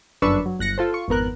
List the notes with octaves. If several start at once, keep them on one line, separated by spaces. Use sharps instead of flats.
G1 F#2 D4 B4 C#6 E6
F#3
G1 F#6 A#6 C#7
F4 A4 C5
F4 C#6
G#1 F2 B3 A#4 F#6